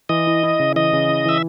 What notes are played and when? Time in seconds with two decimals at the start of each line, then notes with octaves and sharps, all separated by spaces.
0.09 E3 D#5
0.27 E4
0.43 E4
0.60 C#3
0.76 E3 D#5
0.93 C#3
1.09 E4
1.25 E3 E5